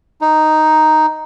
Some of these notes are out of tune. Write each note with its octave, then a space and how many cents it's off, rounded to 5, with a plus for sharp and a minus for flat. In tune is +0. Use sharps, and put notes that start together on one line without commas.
D#4 +0